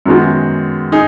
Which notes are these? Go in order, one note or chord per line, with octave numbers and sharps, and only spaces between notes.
F#2 D#3 G#3 B3 F#4
D#4 G#4